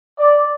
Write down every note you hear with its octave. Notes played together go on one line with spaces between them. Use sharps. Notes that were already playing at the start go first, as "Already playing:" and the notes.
D5